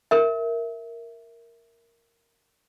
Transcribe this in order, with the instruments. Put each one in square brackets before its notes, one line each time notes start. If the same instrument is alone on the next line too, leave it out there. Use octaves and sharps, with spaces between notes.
[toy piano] A#4 E5